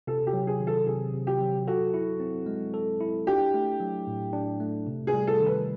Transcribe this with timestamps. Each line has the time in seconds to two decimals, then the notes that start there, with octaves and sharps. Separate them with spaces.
0.07 C3 A4
0.27 G4
0.33 F#3
0.47 G#4
0.60 D#3
0.67 A4
0.87 C3 G#4
1.14 C3
1.27 G4
1.41 F#3
1.68 F#4 A4
1.94 E4
2.20 C4
2.46 G#3
2.74 A4
3.00 E4
3.27 D4 G4
3.54 A3
3.80 F#3
4.07 A2
4.33 D4
4.60 A3
4.87 C3
5.07 G#4
5.14 G3
5.27 A4
5.40 D#3
5.46 B4